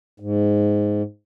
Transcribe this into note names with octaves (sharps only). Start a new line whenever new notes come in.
G#2